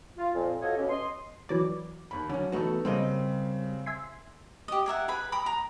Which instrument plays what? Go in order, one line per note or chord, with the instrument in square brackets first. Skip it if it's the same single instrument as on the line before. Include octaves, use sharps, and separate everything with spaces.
[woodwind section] F4
F2 A#2
F4 F#4 A4 C#5 D#5
B2 C#4 G4
D#5 C6
[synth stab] E3 F#3 D5 [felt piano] D6
[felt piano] D#2 B5
[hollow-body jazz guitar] F#2 D3 [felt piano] C#4
[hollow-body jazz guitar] E2 A3 F#4 [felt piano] B3 D#4 A4
[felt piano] C#3 C4 [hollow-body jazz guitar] G3 A#3 D#5
[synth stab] E5 G#5 C6
[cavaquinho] G4 D#5
G#4 A#4 E5 F#5
G#4 B4 B5
G5 A#5 B5 D#6
A#5